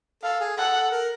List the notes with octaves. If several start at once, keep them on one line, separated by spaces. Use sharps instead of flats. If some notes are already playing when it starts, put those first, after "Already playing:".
A4 F5
G#4
A4 F#5
A#4